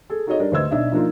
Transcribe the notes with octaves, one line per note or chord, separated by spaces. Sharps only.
G#4 A4
D#4 F#4 G#4 A4 C#5 D#5
G3 D4 A#4 D5
D2 B4 C5 D#5 E6 G#6
B1 D4 D#5 E5
F3 A#3 D4 D#4 F4